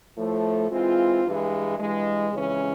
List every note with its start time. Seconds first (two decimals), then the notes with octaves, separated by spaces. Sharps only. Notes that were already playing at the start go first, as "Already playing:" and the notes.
0.17 A2 F3 A3
0.71 E3 G#3 C4 F4
1.25 G2 E3 G#3
1.79 G2 E3 G#3
2.32 F2 C#3 E3 G#3 C#4